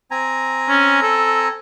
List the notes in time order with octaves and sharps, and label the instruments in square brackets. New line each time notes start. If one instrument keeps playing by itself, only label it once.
[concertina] C4 G#5 A#5
[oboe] C#4
A4